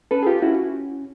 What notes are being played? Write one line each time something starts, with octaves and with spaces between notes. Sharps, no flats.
C#4 A4 B4
G#4
F4 G4
C#4 E4 F#4